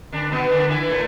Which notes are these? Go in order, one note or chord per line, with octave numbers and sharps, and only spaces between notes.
D3 D4
B2 B3
D3 D4
E3 E4
A2 A3